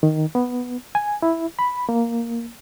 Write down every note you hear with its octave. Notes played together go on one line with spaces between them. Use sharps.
D#3
B3
G#5
E4
B5
A#3